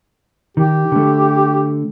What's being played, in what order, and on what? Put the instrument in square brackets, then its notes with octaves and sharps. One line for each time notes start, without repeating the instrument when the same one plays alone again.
[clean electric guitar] D#3 [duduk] G4
[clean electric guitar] D3 A3